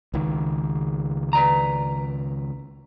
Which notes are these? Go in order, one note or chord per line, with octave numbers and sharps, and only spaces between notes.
C#2 D#3
B4 D5 A#5